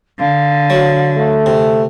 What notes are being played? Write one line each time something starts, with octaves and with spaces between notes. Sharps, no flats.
D3 F5
F#3
A3
C3